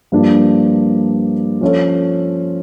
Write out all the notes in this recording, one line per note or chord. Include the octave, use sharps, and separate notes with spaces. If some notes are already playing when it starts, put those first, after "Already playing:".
G2 F3 A#3 D4
F3 C#4 F4 A4 C#5